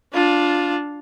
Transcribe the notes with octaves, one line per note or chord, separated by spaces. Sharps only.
D4 F4